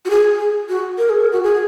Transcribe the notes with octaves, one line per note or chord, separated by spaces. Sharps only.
F#4
G#4
G#4
F#4
A#4
G#4
A#4
F#4
G#4